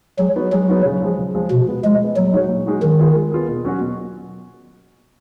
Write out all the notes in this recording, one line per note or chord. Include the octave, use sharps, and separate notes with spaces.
F#3 G#3
B3 D#4 F#4
F#3 G#3
B3 D#4 F#4
C#3
F3 G#3
C#3
F3 G#3
B2 F3
G#3 B3
F3 G#3
G#3 B3
A#2 F#3
G#3 D#4 F#4
A#2
G#3 D#4 F#4
D#3 G#3
B3 F4 G#4
G#3
B3 F4 G#4
B2
F#3 C#4 F#4
B2